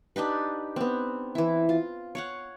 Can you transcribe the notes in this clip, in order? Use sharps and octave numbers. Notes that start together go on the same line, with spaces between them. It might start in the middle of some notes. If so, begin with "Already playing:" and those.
D4 D#4 G4 B4
B3 C4
E3 E4
F4
C#5 F5 F#5